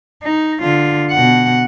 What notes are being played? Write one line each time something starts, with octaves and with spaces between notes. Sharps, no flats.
D#4
D3 F4
B2 F#5